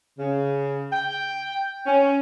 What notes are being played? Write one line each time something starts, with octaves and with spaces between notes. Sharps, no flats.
C#3
G5
C#4